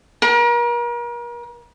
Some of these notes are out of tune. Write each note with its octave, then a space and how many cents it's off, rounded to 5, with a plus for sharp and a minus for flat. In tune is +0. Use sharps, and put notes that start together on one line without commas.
A#4 +40